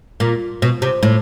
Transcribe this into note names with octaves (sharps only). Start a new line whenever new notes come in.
A#2
B2
C3
A2